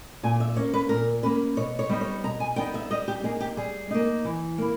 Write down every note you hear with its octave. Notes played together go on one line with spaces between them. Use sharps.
A#2 G#5
E5
A#3 C#4 C#5
B4
A#2 A#4
A#3 C#4 B4
B2 C#5
C#5
G3 B3 D#4
C#5
B2 A#5
G#5
G3 B3 D#4 G5
E5
G3 D#5
G4
A#3 D#4 G#4
G4
G3 G#4
A#3 D#4
E3
A#3 E4